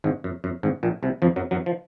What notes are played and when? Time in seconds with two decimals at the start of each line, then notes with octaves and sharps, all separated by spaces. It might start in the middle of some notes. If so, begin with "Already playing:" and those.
0.04 G#1 G#2
0.24 F#2
0.44 F#2
0.63 G#1 G#2
0.83 A#1 A#2
1.03 C2 C3
1.22 F2 F3
1.36 F#2 F#3
1.51 F#2 F#3
1.66 F3